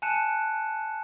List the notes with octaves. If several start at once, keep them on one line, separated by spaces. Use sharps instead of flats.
G#5 A5 F#6 C#7 E7